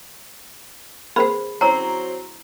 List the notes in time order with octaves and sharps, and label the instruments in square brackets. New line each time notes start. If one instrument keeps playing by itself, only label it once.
[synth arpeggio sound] A#3 C4 B4 [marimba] G#4 C5 [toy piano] B5
[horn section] F#3 C4 [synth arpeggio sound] C#4 C#5 [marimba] E4 C5 [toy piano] A#5